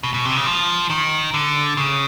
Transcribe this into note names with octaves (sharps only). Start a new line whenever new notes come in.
B2
B2
C3
C#3
F3
D#3
D3
C#3